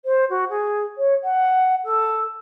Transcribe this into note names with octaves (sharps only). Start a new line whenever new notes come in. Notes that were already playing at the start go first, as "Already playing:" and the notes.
C5
F#4
G#4
C#5
F#5
A4